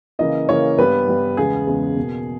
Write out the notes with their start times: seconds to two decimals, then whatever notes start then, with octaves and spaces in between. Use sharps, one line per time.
0.19 C#3 E3 A#3 D#5
0.49 C#3 E3 A#3 C#5
0.78 G2 G3 B3 B4
1.08 G2 G3 B3
1.37 E2 C#3 G#3 B3 G#4
1.67 E2 C#3 G#3 B3
1.96 B2 A#3